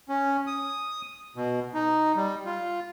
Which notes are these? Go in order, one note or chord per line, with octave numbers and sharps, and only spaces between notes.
C#4
D#6
B2
D#4
G3
F4